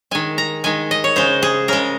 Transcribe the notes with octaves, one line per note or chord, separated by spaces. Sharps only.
D#3 G#3 G#5
A#5
D#3 G#3 G#5
D#5
C#5
C#3 G#3 C5
G#4
C#3 G#3 A#4